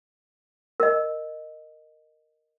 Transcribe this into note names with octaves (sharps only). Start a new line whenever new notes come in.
A#4 D#5